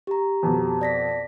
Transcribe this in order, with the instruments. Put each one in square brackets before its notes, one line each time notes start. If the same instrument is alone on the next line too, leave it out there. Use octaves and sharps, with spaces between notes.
[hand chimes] G4 A#5
[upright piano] F2 B2
[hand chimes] D5 A#6 B6